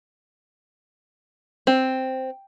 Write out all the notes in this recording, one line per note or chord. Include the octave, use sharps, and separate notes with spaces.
C4